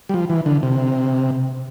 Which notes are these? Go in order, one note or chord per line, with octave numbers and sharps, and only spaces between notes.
G3
F3
E3
D3
C3